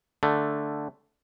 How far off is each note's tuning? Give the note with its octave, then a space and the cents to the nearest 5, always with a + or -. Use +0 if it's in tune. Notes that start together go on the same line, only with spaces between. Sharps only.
D3 +0 A3 +0